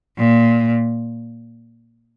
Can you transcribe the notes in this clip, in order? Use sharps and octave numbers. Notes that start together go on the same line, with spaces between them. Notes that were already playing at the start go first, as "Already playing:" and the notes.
A#2